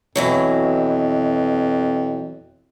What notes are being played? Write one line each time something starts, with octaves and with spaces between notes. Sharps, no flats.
F2 B2 E3 F#3